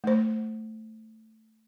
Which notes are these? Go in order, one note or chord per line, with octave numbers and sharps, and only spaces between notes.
A3 C5